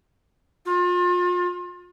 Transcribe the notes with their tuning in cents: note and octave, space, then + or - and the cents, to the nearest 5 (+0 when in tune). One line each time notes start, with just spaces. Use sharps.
F4 +35